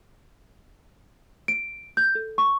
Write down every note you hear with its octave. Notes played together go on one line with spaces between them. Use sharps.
D7
G6
A4
C#6